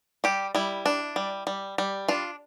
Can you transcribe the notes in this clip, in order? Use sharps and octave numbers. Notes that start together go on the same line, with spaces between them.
G3 G4
G3 E4
D4
G3
G3
G3
D4 F4